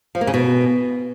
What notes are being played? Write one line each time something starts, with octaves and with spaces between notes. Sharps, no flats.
F3
A#3
C#3
B2